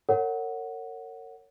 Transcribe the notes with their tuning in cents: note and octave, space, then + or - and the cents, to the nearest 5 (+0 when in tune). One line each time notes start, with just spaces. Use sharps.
A#4 -35 C#5 +0 F#5 +0